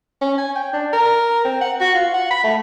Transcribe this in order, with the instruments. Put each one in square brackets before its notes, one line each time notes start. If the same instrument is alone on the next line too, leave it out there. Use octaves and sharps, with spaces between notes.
[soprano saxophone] C#4
G#5
G5
D4
A#4
C4
F#5
F#4
F4
F#5
B5
A3